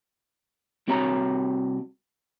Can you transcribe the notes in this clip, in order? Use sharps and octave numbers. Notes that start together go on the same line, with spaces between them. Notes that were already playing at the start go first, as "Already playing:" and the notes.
C2 C4 F#4 C#5 A#5